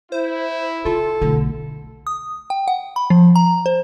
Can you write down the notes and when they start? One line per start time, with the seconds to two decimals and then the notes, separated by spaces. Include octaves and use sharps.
0.12 E4 C5
0.85 C#3 F4 A4
1.22 B1 D3 A3
2.07 D#6
2.50 G5
2.68 F#5
2.96 B5
3.10 F3
3.36 A#5
3.66 C5